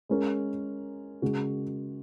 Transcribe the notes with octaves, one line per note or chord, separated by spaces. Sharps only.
G#3 C#4 A#4
C#3 G#3 F#4